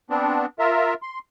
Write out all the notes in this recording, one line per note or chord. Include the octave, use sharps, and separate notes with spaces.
B3 C4 D4
F4 A#4 E5
C6